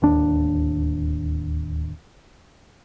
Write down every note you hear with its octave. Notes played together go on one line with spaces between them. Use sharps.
D1 D#2 D4